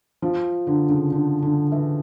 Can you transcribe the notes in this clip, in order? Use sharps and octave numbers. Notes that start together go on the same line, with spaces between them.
F3
D3
C#3
D3
D3
E3